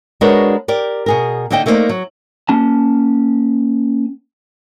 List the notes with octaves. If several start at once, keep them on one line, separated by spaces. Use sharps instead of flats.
G#3 D4 F#4 A#4 B4 C#5
G4 A#4 D5
B2 G#4 A#4
D3 A#3 D#4 D#5 E5 G5
A3 A#3 D#4 F#4 C5 D5
F#3
A#3 C#4 A5